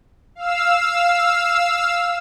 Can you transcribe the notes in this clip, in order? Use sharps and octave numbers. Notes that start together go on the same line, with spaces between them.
F5 E6